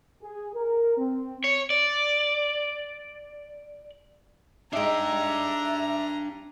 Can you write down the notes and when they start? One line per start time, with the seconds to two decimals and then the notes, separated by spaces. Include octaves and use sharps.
0.23 G#4
0.55 A#4
0.98 C4
1.44 C#5
1.70 D5
4.73 G#3 D4 D#4 E5 G5 A#5